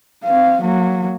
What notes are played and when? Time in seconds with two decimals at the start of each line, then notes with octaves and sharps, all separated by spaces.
0.24 C4 F5
0.62 F#3 A#3